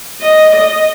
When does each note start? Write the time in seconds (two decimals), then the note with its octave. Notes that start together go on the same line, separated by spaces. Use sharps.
0.21 D#5
0.53 D#5